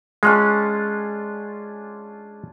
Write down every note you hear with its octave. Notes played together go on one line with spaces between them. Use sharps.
G#3 C#4 D4 F4